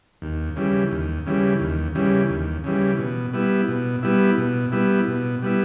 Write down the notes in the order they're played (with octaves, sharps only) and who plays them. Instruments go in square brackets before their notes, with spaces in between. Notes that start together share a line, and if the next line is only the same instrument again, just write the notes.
[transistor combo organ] D#2
C#3 E3 G3
D#2
C#3 E3 G3
D#2
C#3 E3 G3
D#2
C#3 E3 G3
B2
G3 B3 E4
B2
G3 B3 E4
B2
G3 B3 E4
B2
G3 B3 E4